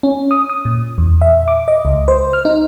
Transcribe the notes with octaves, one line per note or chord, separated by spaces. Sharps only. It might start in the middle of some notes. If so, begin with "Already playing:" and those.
C#4
D#6
D#6
A#2
E2
E5
D6
D#5
C#2
C5
F6
D#4